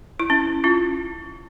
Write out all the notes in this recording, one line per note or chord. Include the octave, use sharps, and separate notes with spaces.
E4
C#4
C#4 F4